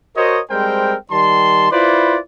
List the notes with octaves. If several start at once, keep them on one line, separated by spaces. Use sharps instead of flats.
F#4 A#4 C5 C#5 D#5
G3 G#3 C4 A#4 C5 G5
D#3 G3 A5 C6
E4 F4 B4 C5 D5